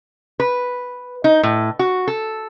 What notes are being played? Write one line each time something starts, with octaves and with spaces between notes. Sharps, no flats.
B4
D#4
A2
F#4
A4